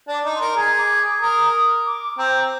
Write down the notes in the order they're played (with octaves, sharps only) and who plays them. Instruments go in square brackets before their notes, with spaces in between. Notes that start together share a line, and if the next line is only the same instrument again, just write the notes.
[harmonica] D4
[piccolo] D6
[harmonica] D#4
[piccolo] C6
[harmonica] A#4
[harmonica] G#4 [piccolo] A#5
[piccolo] D6
D6
[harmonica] A#4 [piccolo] D#6
[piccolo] D6
[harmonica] C4 [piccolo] A#5